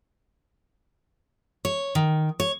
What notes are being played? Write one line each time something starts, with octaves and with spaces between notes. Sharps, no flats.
C#5
D#3
C#5